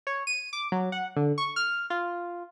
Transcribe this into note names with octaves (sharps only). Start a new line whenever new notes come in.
C#5
D#7
D6
F#3
F#5
D3
C#6
F6
F4